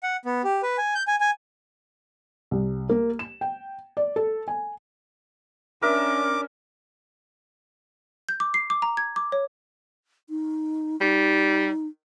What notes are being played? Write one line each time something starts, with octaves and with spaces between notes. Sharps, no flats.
F#5
B3
G4
B4
G#5
G6
G#5
G#5
C2
A#3
E7
G5
D5
A4
G#5
C#4 D4 A#4 E5 D6
G6
D6
C7
D6
A#5
G#6
D6
C#5
D#4
G3 D#4